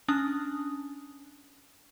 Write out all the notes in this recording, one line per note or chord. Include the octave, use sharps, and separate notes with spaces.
C#4 D4 D#6